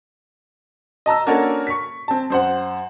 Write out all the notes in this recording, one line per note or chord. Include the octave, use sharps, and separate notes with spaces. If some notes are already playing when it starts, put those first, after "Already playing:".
D#5 A5 A#5 E6
A#3 C#4 D4 F#4 A4 A#4
C#6 B6
C4 A5
F#2 C5 F#5